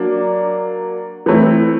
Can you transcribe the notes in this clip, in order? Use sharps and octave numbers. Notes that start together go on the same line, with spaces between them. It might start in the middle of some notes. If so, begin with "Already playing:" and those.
Already playing: F#3 A#3 D4
E3 A3 C4 E4